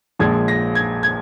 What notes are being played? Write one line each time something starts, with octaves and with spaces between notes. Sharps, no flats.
A#1 A#2 F3 G#3 G#6
A#6
G#6
G#6